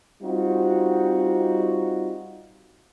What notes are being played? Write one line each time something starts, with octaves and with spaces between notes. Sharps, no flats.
G3 C4 D#4 F4 F#4